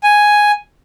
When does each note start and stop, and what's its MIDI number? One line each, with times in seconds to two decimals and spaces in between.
0.03 0.52 80